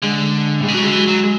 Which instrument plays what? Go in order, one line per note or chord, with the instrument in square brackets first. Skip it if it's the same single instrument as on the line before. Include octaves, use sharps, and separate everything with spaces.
[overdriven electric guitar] D3 [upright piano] G#3
[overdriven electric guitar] A2 [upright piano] G#3
[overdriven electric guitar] B2
[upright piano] F#3
[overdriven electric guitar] C#3
[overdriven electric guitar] D3 [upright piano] G#3
[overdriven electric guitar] E3
F#3
[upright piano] G#3